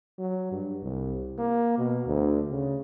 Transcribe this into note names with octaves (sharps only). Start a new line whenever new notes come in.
F#3
G2
C2
A#3
B2
D2
C#3